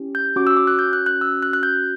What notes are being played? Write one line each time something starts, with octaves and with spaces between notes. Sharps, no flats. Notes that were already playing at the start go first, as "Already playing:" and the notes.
Already playing: C#4 E4 G4
G6
C#4 F#4 D6
E6
D6
F#6
G6
F#6
F#6
E6
F#6
F#6
G6